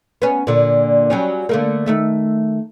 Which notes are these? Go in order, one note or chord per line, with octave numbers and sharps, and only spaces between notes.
B3 C#4
A#2 D3
F#3 G3 C#4
D3 A3 A#3
D#3 A3 E5